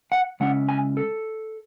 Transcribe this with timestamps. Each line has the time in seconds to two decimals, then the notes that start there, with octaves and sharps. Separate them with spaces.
0.12 F#5
0.40 C#3 G#3 C#4 E4 F#5
0.69 G#5
0.97 A4